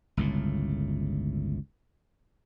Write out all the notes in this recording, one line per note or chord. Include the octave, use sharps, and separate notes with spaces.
G1 C#2 A2